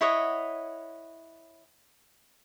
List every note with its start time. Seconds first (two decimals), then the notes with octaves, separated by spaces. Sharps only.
0.01 E4 C#5 D#5 F#5